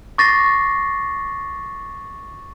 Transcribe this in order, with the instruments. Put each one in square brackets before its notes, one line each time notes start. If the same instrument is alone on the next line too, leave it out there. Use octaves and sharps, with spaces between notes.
[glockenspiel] C#6 D6 A6 A#6 C7